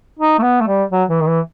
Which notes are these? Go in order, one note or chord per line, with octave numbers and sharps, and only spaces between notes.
D#4
A3
B3
A3
G3
F#3
E3
D#3
E3